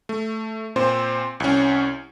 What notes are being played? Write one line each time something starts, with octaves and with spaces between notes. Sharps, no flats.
A3
A#2 C4 C5
C2 C#4